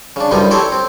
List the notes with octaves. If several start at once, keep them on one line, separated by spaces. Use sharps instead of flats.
C#3 D4
F#2 A2 F3 G3 B3 D#4
C4 E4 G4 A4 C5 C#5
C4